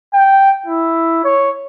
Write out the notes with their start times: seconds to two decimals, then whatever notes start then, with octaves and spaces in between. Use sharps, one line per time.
0.14 G5
0.66 E4
1.24 C#5